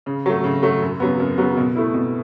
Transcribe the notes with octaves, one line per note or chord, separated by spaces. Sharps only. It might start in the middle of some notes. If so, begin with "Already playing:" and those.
C#3
F#3 A3
C#3
F#3 A3
F#2
C#3 F#3 B3
F#2
C#3 F#3 B3
B2
A3 E4
B2